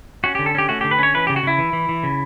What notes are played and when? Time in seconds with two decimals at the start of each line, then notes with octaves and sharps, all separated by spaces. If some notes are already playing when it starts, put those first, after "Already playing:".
0.24 C#4 F#4
0.35 D3 G4
0.46 A4
0.55 C#4 G4
0.69 A3 F#4
0.81 D3 G4
0.91 B4
0.98 C#4 C#5
1.14 E3 B4
1.27 C#3 G4
1.36 F#4
1.43 C#3 E4
1.58 E3
1.73 E3
1.89 E3
2.03 C#3